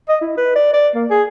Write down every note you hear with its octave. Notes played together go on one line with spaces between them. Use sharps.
D#5
E4
B4
D5
D5
A#3
G#4